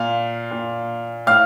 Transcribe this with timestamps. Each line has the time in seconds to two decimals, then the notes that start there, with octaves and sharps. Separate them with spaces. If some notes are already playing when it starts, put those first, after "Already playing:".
Already playing: A#2 F5
0.51 A#2
1.26 A2 F5 F6